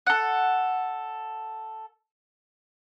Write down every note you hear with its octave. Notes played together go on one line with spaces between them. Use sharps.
A4 F#5